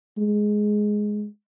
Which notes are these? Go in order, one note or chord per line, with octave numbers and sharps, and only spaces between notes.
G#3